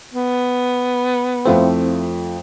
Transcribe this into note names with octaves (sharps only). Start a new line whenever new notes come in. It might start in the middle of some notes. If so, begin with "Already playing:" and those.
B3
F2 F3 A3 C4 E4 F4